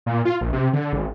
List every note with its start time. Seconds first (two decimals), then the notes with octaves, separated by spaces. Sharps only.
0.06 A#2
0.25 F4
0.41 A#1
0.53 C3
0.73 D3
0.93 G#1